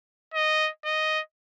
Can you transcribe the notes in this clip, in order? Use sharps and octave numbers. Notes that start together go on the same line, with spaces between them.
D#5
D#5